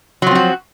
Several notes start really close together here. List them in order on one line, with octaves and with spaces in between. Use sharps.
F#3 F3 C4 F#4